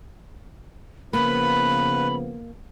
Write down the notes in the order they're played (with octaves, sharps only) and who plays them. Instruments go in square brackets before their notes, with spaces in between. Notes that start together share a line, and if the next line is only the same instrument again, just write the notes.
[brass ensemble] C#3 F3 B3 [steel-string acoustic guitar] A#3 [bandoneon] B4 [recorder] B5